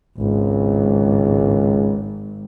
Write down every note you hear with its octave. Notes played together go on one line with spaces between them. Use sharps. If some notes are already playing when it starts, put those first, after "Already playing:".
G#1 C#2